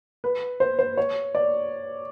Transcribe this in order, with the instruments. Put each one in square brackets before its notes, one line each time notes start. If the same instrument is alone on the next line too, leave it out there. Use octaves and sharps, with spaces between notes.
[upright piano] B4
C5
C5
C#5
D5